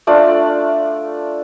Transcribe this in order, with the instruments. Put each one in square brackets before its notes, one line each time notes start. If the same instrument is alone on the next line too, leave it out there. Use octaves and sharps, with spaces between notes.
[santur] A3 D4 F4 D5